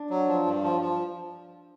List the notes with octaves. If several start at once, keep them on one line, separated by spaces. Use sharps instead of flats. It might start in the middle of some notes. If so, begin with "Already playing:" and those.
Already playing: D4
F#3
F3
G2
F3
F3